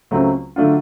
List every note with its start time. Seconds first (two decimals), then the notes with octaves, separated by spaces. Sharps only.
0.11 C#2 C#3 F#3 A3 C4
0.56 D3 F#3 A3 D4 F4